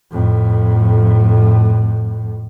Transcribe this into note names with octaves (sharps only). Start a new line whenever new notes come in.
F2 A2